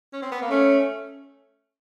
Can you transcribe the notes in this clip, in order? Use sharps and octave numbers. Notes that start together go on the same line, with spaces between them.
C#4
C4
B3
A#3
A3 C#4